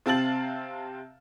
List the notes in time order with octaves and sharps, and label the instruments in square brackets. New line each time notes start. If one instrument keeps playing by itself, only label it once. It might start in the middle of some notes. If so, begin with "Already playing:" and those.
[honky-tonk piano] C3 C4 F5 A5 A6 F#7